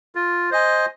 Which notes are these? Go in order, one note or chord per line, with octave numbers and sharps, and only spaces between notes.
F4
C5 D#5 G#5